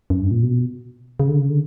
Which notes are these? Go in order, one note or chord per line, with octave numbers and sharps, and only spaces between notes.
F#2
G2
A#2
B2
C#3
D3
C#3
D3